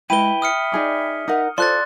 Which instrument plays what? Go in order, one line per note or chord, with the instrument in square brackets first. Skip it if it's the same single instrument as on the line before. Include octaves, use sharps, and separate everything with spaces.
[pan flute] G#3 [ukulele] E4 B4 [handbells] G5 B5 [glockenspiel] D#7 G7
[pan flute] E5 [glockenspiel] D#6 F6 C#7
[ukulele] D#4 G#4 D5
D#4 A#4 F#5
[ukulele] F4 A4 [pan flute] C5 [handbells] D5 [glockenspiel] C6 F#6 A6